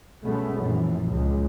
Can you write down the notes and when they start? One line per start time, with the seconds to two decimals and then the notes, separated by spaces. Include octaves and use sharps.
0.23 B2 G#3 A3 B3 C#4
0.60 A#1 F#2 E3
1.11 C#2 G#3